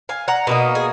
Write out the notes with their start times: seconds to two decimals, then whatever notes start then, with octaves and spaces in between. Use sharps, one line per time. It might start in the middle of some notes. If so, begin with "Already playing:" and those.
0.09 F5 G#5
0.28 F#5 A#5
0.47 B2 A#3 D#4
0.75 G#4